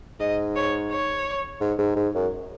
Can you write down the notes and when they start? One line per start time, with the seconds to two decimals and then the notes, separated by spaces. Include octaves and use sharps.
0.20 G#2 D#5
0.56 C#5
0.91 C#5
1.61 G#2
1.79 G#2
1.96 G#2
2.14 F#2